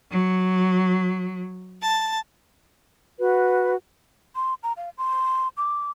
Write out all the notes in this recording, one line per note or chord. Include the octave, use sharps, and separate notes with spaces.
F#3
A5
F#4 B4
C6
A#5
F5
C6
D6